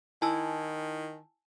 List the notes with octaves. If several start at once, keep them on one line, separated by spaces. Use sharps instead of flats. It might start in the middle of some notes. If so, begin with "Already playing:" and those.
D#3 E4 G#5 A5 E6